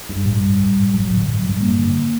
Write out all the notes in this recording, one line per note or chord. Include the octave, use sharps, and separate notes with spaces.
G2
A2 G3
A2
A2
A2
A2 F#3
F#3
A2
D3
A2
F#3
A2
G3
G2 A#3
D3